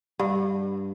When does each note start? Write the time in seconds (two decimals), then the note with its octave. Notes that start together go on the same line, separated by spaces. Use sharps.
0.19 G2